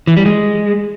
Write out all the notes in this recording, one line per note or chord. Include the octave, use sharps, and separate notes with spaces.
E3
G3
G#3